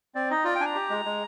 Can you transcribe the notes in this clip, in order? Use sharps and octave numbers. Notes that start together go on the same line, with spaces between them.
C4 D5
D#4 D#5
F4 D5
G5
D4 G#5 A#5
G4
G#3
G#3